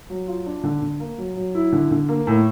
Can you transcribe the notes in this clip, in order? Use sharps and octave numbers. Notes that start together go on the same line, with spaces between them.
F#3
F4
D4
D3
D3
A#3
F#3
F#3
E4
D3
D3
A#3
A2